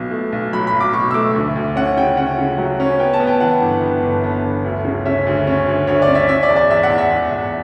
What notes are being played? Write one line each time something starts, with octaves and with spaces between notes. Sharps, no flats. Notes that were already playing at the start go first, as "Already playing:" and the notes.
Already playing: B1 B2
A3
B1
F#3 B5
B5
B1
D6
B2 C#6
E6
A3 D6
D2
D2
C#4 F#5
C#3 G5
C#4 F#5
C#3
F#3
C#4
B3 G5
A5
B3
G5
E3 F#5
G1
B3
G1
B3
G1
D2
C#3
C#4 E5
D2
C#4
D2
D2 C#5
D5
C#4
E5
C#4 E5
D5
E2
D5
E2 E5
F#5
E2
E5
E2
E2